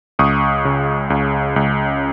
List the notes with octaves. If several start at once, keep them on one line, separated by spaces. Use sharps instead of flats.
C#2 C#6 D#6
C#3
C#2
C#2